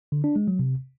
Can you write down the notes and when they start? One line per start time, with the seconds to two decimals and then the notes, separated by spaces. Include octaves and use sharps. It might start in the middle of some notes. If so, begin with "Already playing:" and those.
0.12 D3
0.24 D4
0.36 G#3
0.48 F#3
0.59 C3